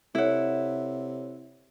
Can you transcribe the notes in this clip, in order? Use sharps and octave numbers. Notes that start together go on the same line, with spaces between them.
C3 E4 A4 C#5 F#5